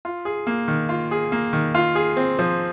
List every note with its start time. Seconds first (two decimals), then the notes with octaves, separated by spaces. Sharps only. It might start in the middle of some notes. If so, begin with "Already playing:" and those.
0.05 F4
0.25 G#4
0.47 A#3
0.68 D#3
0.89 F4
1.11 G#4
1.32 A#3
1.53 D#3
1.75 F4
1.95 G#4
2.17 C4
2.39 F3